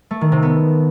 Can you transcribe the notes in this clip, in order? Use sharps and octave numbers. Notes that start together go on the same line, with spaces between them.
A3
D#3
C3
B3